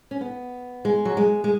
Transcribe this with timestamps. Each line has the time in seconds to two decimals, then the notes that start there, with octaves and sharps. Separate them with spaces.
0.11 C#4
0.21 B3
0.85 G#3
1.05 F#3
1.17 G#3
1.44 G#3